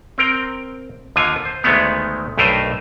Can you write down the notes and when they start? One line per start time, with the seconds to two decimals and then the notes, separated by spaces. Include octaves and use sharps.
0.18 C4 A#4 G5
1.16 D#2 D3 F4 G#5
1.45 C5
1.63 D2 D#3 G#3 A3 B3 C#5
2.38 B1 G2 A3 A#4 C5 D#5